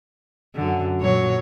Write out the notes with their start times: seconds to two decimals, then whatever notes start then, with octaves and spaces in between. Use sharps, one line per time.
0.55 F#2 D3
1.01 A#2 F#3 C#5